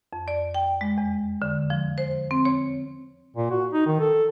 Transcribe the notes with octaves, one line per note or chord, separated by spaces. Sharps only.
F2
D5
G5
G#3
E2
D3
F3
C5
C4
C#5
A#2
F#4
D#4
D#3
A4